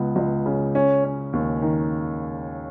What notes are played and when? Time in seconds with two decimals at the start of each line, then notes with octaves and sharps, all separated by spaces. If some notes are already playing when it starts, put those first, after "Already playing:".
Already playing: C#2 B3
0.16 C#2
0.46 C#3
0.75 C#4
1.04 C#4
1.33 D#2
1.62 D#3